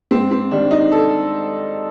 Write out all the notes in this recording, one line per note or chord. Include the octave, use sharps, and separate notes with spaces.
G#2 C4
C4
D#3 G3 D4
D#4
A4